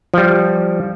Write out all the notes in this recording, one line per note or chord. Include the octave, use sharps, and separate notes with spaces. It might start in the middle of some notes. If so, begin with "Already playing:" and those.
F3 G3